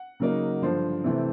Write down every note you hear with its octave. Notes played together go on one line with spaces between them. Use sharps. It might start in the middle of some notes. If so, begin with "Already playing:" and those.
Already playing: F#5
C#3 F#3 A#3 D#4
G2 D3 F3 C5
C3 E3 A3 C4